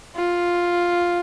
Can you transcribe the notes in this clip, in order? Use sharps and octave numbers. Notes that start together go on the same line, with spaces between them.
F4